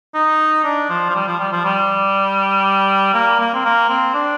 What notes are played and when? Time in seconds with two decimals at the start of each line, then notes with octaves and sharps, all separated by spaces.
0.14 D#4
0.64 D4
0.89 F3
1.10 F3
1.15 G3
1.27 F3
1.39 G3
1.52 F3
1.64 G3
3.14 A#3
3.40 A#3
3.53 C4
3.65 A#3
3.89 C4
4.14 D4